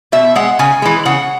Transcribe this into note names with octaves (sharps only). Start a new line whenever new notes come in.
B2 E5
G#3 F#5
C#3 G#5
E3 G#3
C#3 F#5